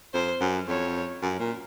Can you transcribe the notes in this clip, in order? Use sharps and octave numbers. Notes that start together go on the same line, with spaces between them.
F2 C5
F#2
F2 C#5
F#2
A#2